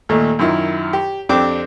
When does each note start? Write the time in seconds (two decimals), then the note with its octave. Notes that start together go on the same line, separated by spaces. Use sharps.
0.09 D#2 A#2 A3
0.39 F#2 D#3 E4 F4
0.93 G4
1.29 F2 C4 D4 G4 D6